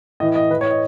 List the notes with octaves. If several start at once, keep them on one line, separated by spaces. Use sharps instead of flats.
A2 E3 D#5
D#5
A2 E3 B4
C#5
D#5